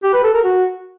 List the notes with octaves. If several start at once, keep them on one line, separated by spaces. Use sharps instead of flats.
G4
B4
A4
A#4
F#4